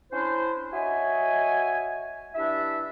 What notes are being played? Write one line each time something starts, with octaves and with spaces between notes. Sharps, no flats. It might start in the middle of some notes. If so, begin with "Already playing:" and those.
C#4 D4 E4 C5
F#4 C#5 D#5 E5 G#5
G2 D4 E4 E5